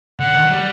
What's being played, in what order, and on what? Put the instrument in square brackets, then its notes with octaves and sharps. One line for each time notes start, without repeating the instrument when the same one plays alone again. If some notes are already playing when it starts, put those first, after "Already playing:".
[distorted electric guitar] D3 [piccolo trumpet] F#5
[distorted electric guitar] D#3
F#3
G3